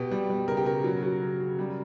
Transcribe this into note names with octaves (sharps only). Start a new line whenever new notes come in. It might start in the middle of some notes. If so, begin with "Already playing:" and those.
Already playing: B2 G4
G3
G3
C#3 A#4
G4
C#3 A#4
F#3
F#3
C#3
C#3
G3